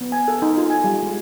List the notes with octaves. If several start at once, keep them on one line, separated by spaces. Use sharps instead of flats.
B3
G#5
A4
D#4
F4
G#5
G3
G#3